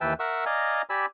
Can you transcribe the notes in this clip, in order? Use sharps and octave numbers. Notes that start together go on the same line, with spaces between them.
D#2 E3 B4 E5 G5 A5
A#4 E5 F#5 C#6 E6
D5 D#5 F5 G#5 A#5
G4 D5 G#5 B5 E6